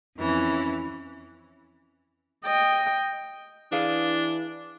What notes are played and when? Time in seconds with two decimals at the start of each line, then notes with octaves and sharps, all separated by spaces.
0.17 F2 E3 C#4
2.45 D#5 G5
3.72 E3 D4 G#4 B4 F5